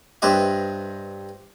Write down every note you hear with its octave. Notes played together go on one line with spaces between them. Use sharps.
G2 C4 B4 D#5 E5